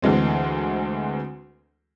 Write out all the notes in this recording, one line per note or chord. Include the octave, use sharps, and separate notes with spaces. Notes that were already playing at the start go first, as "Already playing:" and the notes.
D2 E3 G#3 C4